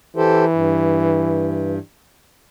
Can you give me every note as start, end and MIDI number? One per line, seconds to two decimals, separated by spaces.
0.17 1.78 52
0.17 0.45 67
0.17 0.45 69
0.17 0.45 72
0.53 1.78 43